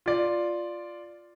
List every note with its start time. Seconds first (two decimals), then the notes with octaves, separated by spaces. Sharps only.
0.06 F4 D5